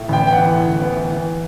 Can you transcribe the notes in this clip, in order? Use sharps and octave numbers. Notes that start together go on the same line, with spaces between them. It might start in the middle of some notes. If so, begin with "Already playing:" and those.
Already playing: A2
A1 G5
B3 G5
F#5
E3
A2
A1
B3
E3
E3